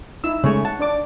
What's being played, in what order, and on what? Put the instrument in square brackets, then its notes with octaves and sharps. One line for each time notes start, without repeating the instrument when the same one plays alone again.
[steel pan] D#4 E4 E6
[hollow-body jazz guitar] C#3 G#3 A3 [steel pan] C#5
[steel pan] F#5 [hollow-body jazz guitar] A5
[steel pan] D4 D5 D6